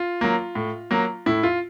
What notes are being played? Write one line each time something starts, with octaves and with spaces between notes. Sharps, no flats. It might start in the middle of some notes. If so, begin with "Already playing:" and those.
Already playing: F4
F#3 A#3
A2
F#3 A#3
A2 E4
F4